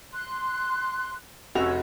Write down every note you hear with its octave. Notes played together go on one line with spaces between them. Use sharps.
C6 F#6
F1 C#4 F#4 E6 F7